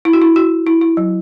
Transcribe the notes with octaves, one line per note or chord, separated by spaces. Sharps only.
E4
F#4
E4
F#4
E4
E4
F#3